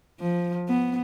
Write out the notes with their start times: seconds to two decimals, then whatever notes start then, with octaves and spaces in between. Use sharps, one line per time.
0.20 F3
0.68 B3